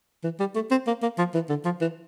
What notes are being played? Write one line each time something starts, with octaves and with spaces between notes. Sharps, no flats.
E3
G3
A3
C4
A#3
A#3
F3
E3
D3
F3
E3